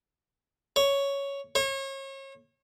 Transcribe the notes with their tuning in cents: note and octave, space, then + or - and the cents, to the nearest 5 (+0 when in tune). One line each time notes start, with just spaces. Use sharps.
C#5 +5
C#5 -35